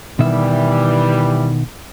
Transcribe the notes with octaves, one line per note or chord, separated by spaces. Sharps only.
B2 D#3 E3 G3 E5